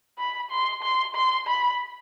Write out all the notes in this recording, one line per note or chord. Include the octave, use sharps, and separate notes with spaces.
B5
C6
C6
C6
B5